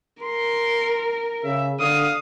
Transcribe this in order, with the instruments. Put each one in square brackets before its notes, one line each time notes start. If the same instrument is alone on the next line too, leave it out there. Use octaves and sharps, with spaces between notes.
[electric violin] A#4 [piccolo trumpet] C6
[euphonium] C#3 [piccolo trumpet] E5
[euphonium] D3 [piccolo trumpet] F5 [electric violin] D#6